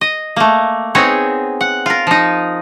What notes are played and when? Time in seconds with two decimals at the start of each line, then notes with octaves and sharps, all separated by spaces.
0.01 D#5
0.36 A3 A#3
0.95 B3 C4 D#4 G#4 C#5
1.61 F#5
1.86 F4 A#4
2.07 F3 D#4